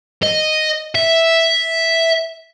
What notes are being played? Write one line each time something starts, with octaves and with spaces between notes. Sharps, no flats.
D#5
E5